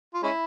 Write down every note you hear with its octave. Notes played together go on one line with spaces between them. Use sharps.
F4
G#3 C#4 E4